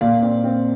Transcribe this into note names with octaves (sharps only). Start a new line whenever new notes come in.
A#2 D5 F5
C4
C4